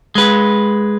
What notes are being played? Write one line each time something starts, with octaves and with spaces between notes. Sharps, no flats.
G#3 B4